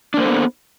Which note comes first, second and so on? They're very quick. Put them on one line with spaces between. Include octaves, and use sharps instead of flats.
D4 A#3 C5 A4 B3